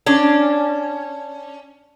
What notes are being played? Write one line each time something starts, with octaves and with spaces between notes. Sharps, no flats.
C#4 D4